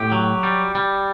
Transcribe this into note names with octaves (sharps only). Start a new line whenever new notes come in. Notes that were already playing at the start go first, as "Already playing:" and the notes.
Already playing: A2 G4
F#3
G3
G3